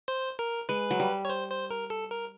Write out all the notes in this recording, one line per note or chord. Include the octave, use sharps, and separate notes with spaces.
C5
A#4
G#3 B4
F#3
G3
C#5
C5
C5
A#4
A4
A#4